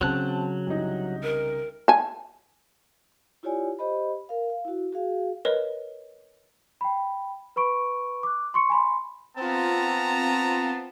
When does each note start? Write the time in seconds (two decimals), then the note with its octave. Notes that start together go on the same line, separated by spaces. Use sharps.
0.01 C#3 F#3 C4 A5 F#6
0.67 C2 D#4
1.23 A#4
1.88 G#5 A5
3.43 E4 F4 G4 C#5 D5 G#5
3.79 G4 C5 D#5 B5
4.29 A#4 F5
4.50 F5
4.65 E4 F#4
4.93 F#4 G#4 F5
5.45 A#4 B4 C#5 D#5
6.81 G5 B5
7.56 B4 B5 C#6 D7
8.23 D6 F#6
8.54 C6 C#6 C#7
8.70 G#5 B5 C6
9.36 B3 C4 F4 A5 A#5